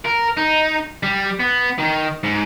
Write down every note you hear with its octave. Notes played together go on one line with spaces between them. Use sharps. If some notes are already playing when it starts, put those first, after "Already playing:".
A#4
D#4
G3
B3
D#3
G#2